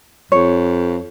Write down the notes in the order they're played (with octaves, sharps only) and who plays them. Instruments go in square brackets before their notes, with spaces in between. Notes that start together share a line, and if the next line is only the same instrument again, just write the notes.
[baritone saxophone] F2 [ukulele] C#5